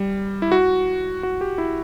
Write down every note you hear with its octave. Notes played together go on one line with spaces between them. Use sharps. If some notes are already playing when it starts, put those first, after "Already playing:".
Already playing: G3
E4
F#4
F#4
G4
E4